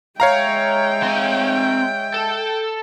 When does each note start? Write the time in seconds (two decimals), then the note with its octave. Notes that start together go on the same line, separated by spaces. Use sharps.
0.20 G#3 C#5 E5 F5 G5 A#5
1.03 C4 G#5
2.14 A4